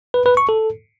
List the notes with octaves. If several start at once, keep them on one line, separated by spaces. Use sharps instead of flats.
B4
B4
C#6
A4